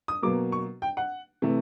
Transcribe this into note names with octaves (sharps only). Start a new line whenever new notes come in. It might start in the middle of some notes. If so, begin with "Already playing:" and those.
D#6
B2 F#3 A#3 D6
C#6
G5
F#5
C3 E3 A3